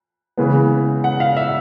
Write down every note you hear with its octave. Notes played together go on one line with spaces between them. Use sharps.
C#3 E3 G#3 B3
F#5
F5
E5